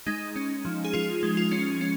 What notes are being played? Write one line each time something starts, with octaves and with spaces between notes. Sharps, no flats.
G#3 D#4
C#4
F3
G#4
F3 F4
G#3
F4
C#4
C#4